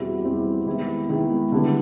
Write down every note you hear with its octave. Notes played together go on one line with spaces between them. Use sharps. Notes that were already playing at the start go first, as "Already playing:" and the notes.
Already playing: E2 B2 G3 C4 E4
E2 B2 G3 C4 E4
D#3 G#3 B3 E4
D#3 G#3 B3 E4
D3 G3 B3 E4